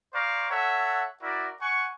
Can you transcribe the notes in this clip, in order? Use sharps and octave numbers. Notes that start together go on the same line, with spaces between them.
C5 D5 F5 A#5 C#6
A4 C#5 E5 F#5
E4 F#4 A#4 D5
F#5 G#5 C#6